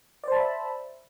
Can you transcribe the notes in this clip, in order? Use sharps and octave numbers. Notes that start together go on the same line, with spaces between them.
C5 D5 E5 A5 B5